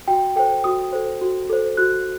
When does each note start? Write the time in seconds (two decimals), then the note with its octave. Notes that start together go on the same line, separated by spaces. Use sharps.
0.08 F#4 G5
0.36 A4 C5 G5
0.64 F#4 D#6
0.93 A4 C5
1.21 F#4
1.50 A4 C5
1.77 F#4 F#6